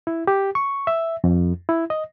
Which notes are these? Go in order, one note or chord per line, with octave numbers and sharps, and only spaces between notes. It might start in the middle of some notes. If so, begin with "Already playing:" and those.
E4
G4
C#6
E5
F2
E4
D#5